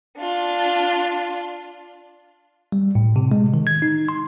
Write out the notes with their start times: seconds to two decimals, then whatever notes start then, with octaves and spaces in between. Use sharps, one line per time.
0.18 D4 F4
2.72 G3
2.95 A2
3.16 C3
3.32 G#3
3.54 D#3
3.67 G#6
3.82 D#4
4.09 C6